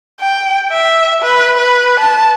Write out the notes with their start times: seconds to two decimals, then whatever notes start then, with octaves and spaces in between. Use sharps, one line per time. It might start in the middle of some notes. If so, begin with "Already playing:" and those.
0.20 G5
0.72 E5
1.22 B4
1.57 B4
2.00 A5